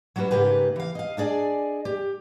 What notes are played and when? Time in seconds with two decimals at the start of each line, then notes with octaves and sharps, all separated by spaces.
0.16 F#3 G3 C#4 F#4 B4
0.31 G#2 C#3 A#3 G4 B4
0.76 E3 F5
0.95 D#5 F5
1.17 D4 G#4 D5 D#5 G#5
1.85 G4